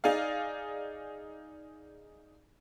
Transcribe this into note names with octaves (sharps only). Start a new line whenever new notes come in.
D#4 G#4 D5 F5